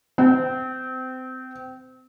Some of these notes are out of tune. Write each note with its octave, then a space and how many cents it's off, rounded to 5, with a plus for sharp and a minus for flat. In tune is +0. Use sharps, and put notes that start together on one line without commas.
C4 -25